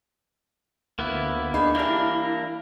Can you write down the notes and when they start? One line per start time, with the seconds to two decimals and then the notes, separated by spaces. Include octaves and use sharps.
0.99 D2 A#3 B3 E4
1.54 D4 D#4 G#4 B5
1.75 E3 G3 A#3 D4 E4 A#4